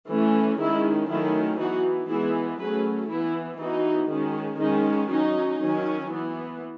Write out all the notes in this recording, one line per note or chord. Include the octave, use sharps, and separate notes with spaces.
E3 A3 C#4
D#3 G#3 C#4 E4
D#3 F#3 A3 C#4 E4
E3 B3 D#4 F#4
E3 G#3 B3 E4 G#4
F#3 A3 C#4 G#4 B4
E3 B3 E4
E3 B3 D#4 F#4
D#3 G#3 C#4
D#3 G#3 C#4 D#4
F#3 C#4 D#4
D#3 F#3 C#4
E3 B3